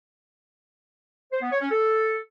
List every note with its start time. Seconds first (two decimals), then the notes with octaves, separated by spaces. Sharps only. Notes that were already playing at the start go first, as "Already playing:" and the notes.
1.32 C5
1.41 B3
1.51 C#5
1.61 C#4
1.71 A4